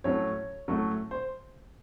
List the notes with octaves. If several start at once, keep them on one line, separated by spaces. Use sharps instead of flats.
A2 F#3 A3 C#4 C#5
A2 F#3 A3 C#4
C5